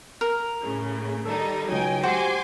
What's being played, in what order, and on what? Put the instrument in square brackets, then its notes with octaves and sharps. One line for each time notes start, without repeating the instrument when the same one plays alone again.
[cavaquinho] A#4
[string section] A2 C#3
[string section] D#3 G3 D#4 [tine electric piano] A4
[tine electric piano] C#2 F#3 [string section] D#4 G5 G#5
[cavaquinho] F#4 [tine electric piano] G4 C5 [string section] G#5 C6 D6